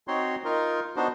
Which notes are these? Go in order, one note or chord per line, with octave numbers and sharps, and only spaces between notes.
C4 D#4 F#4 C#5 C6
D#4 F4 A#4
B3 D4 D#4 F#4 C5